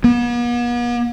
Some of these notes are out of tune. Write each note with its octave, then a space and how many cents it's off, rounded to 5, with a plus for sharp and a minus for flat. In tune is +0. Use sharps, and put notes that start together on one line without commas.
B3 -45